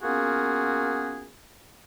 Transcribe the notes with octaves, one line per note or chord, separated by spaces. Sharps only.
A#3 B3 C#4 F4 F#4 G#4